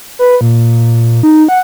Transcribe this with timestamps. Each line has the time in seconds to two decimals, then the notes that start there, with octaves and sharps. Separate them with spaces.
0.19 B4
0.41 A#2
1.23 D#4
1.48 F#5